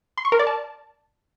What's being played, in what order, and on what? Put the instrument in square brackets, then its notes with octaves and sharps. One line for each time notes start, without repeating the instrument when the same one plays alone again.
[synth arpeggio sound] C6
C#6
A#4
D5
A5